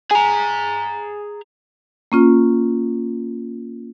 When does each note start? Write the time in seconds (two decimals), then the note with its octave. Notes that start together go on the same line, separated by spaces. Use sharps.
0.11 G#4 G#5 A#5
2.12 A#3 C#4 F4